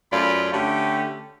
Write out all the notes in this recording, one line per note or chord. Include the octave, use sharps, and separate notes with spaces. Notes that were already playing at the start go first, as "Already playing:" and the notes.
F#2 A3 F4 D5 B5
D3 A3 C#4 G4